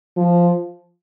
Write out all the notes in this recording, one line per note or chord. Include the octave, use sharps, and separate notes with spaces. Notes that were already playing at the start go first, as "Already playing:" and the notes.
F3